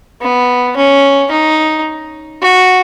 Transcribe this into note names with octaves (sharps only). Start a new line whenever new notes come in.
B3
C#4
D#4
F#4